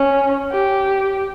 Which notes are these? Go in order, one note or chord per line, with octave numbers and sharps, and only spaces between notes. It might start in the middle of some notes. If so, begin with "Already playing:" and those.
Already playing: C#4
G4